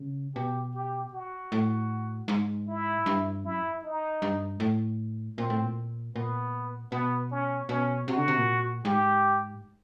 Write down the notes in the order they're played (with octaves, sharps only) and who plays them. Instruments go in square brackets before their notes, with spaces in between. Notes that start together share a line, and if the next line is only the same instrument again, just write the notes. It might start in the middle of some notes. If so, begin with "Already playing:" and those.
Already playing: [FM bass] C#3
[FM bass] B2 [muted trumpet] G4
[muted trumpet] G4
F#4
[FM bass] A2
G#2
[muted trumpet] E4
[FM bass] G2
[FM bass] F#2 [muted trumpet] E4
[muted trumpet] D#4
[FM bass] G2
A2
[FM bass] A#2 [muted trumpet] C4
[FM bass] A2
A#2
[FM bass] A#2 [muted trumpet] B3
[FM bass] B2 [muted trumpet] B3
[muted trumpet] C#4
[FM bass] B2 [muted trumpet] C#4
[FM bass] C3 [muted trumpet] F#4
[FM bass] D3
C3
A#2
[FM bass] G#2 [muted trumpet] G4